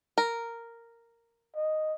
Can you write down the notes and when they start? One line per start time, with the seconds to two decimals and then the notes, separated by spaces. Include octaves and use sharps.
0.18 A#4
1.56 D#5